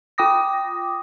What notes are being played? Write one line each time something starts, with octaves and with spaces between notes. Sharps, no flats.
F4 G5 D6 D#6 A#6